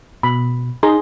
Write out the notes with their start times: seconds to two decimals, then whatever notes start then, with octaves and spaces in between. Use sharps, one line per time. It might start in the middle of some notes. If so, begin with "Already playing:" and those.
0.23 B2 B5
0.83 D#4 G#4 A#5 C6